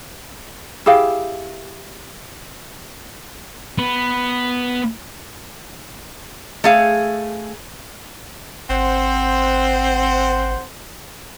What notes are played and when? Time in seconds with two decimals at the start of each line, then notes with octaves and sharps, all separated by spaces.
0.86 E4 G4 G#4 F5
3.78 B3
6.64 A3 G#4 F5
8.70 G#1 C4 C5 F#5